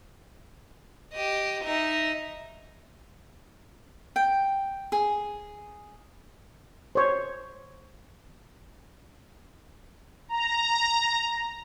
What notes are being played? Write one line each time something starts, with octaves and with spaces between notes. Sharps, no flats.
G4 D#5
D#4 E5
G5
G#4
C5 C#5
A#5